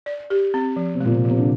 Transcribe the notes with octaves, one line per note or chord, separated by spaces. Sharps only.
D5
G4
C4
F3
C3
A#2 G#3
C3
F3
C3
D3